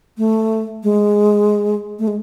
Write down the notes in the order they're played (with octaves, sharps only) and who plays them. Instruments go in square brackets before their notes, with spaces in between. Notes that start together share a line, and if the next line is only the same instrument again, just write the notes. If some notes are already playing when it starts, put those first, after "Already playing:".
[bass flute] A3
G#3
A3
G#3